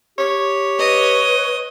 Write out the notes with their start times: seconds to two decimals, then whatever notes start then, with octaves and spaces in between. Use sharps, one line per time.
0.18 G4 C#5
0.79 B4 D#5